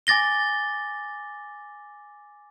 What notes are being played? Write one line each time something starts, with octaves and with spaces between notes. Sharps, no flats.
G#5 D6 A6 A#6 G7